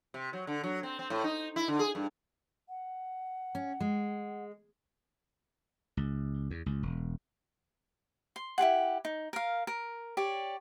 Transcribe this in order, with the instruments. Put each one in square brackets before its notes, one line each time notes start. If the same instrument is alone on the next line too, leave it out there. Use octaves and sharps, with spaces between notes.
[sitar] C3
F#3
D3
F#3
C4
C4
A2
D#4
E4
D3
G#4
G2
[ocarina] F#5
[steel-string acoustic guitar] C#4
G#3
[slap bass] C#2
E2
C#2
E1
[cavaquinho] C6
E4 G4 G#4 F#5
D#4
A#4 F5
A#4
G4 C#5 D5